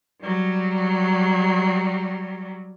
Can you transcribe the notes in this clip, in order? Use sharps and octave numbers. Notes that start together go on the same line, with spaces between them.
F#3 G3